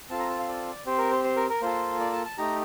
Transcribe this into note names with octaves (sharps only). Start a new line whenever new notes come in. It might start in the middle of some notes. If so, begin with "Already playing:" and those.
C4 F4 A4 A5
A#5
A5
F5
D5
C4 G4 C5
A#4
C5
C5
A#4
A#4
A#3 F4 A4 C5
D5
A5
A5
A3 D#4 G4 A#5